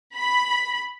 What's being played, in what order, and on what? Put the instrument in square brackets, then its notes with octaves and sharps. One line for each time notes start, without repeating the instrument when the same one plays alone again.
[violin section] B5